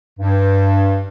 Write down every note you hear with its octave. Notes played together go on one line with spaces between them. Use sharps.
G2